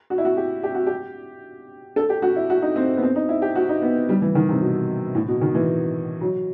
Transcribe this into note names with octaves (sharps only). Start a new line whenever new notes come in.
F#4
E4
F#4
G4
G4
F#4
G4
A4
G4
F#4
E4
F#4
D#4
C4
B3
C4
D#4
E4
G4
F#4
D#4
B3
G3
E3
D#3
C3
B2
A2
B2
D#3
E3
F#3